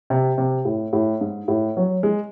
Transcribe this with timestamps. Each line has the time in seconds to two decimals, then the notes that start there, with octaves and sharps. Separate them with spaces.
0.10 C3
0.38 C3
0.65 A2
0.93 A2
1.21 G#2
1.48 A2
1.77 F#3
2.03 G#3